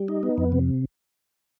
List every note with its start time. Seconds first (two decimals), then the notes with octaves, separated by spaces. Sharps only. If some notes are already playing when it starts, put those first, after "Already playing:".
Already playing: G3
0.08 D#4
0.23 B3
0.38 F2
0.52 C3